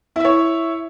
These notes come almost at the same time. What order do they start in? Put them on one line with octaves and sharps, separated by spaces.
E4 E5 C#5